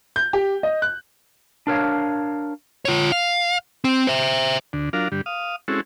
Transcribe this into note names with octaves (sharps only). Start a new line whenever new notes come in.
G6
G4
D#5
F#6
D4 A#4 C#5 F5
F4 C#5
F5
C4
C5 E5
D2 D3
F#3 D4 F4 A#4 F5
G2 D3 G3
F5 D#6
G#3 C4 C#4 E4 F#4 A4